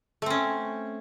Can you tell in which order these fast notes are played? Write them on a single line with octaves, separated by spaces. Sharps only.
A3 C4 C#4